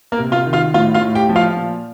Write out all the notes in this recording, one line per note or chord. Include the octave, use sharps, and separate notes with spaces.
A#3 A#4
C3
F4 F5
D#3
F4 F5
A2 F4 F5
F4 F5
A2
G4 G5
F3
F4 F5
A#2